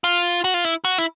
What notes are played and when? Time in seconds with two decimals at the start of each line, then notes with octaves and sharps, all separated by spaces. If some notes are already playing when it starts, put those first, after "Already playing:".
0.04 F4
0.44 F#4
0.54 F4
0.64 E4
0.85 F#4
0.98 E4